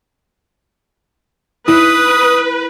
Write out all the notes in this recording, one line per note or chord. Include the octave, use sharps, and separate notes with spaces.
E4 B4 D#6